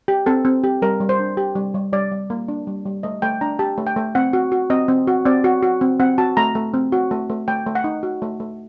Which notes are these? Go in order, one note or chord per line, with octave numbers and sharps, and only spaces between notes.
G4
C4 A4
C4
G4
G3 A#4
G3
C5
D4
G4
G3
G3
G3 D5
G3
A#3
D4
G3
G3
A3 D#5
A3 G5
D4 A#5
G4 A5
A3
G5
A3
C4 F#5
F#4
F#4
C4 D#5
C4
F#4
C4 D5
F#4
F#4
C4
C4 F#5
F#4 A5
A3 A#5
A3
C4
F#4
A3
A3
A3 G5
A3
F#5
D#4
F#4
A3
A3